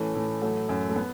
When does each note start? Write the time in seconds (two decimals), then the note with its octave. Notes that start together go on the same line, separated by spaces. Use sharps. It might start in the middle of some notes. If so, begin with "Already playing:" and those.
Already playing: A2 E3 A3 C#4
0.15 A2
0.42 F#3 A3
0.69 F#2
0.89 A3
0.96 B3